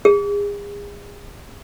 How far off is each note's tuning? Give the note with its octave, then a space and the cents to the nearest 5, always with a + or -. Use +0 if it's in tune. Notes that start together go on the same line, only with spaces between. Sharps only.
G#4 -35